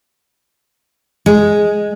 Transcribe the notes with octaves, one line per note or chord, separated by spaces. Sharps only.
G#3